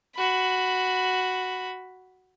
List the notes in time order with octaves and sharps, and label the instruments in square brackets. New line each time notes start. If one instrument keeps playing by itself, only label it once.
[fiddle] F#4 B5